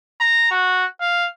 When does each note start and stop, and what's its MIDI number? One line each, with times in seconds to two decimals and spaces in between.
0.20 0.49 82
0.51 0.85 66
1.01 1.27 77